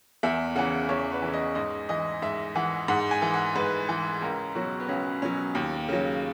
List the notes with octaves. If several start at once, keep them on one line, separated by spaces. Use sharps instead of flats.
E2 E5
C#3 E3 F#5
E2 C#5
B4
E3
C#3
D#5
G#2 D#5
E3 D#5
G#2 E5
E3 F#5
G#2 F#5
G#5
E3
F#5
G#2 B4
E3
C#2 A#4
B2 F#3 F#4
B3
C#2 C#4
B2 F#3 C#4
D#2
C#3 F#3